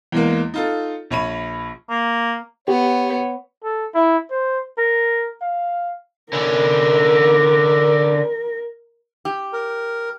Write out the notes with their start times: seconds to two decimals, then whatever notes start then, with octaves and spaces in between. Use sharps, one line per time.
0.12 E2 G#3 A#3
0.54 D#4 F4 A4
1.11 A#1 C#5 B5 D#7
1.90 A#3
2.68 B3 G4 C#5
3.63 A4
3.94 E4
4.30 C5
4.78 A#4
5.41 F5
6.33 D3 C#4 A#4
9.25 G4
9.53 A#4